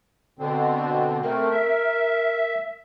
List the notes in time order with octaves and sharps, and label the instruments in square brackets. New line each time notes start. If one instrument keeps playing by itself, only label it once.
[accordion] B2 D3 C4
[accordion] A3 C4 [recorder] A#4
[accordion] E5